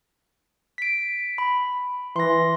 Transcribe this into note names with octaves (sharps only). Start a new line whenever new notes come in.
B6 D7
B5
E3 C6 A#6